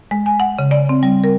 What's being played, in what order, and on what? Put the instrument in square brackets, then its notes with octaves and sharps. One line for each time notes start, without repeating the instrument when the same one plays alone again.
[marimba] G#3
G#5
F#5
C#3
D5
C4
G3
A#4